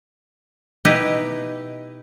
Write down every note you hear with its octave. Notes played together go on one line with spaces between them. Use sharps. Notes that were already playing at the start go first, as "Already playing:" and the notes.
B2 D#4 E4 G4 B4 D#5